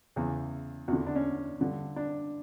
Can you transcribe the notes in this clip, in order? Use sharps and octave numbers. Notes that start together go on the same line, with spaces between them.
E2 C#3 E3
E2 D3 F#4
D4
C#4
G2 D3
D4